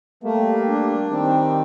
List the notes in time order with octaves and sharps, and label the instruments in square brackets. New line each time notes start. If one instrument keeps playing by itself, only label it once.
[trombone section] G3 A#3 [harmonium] A3
[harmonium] D4
[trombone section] D#3 G3 [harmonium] C4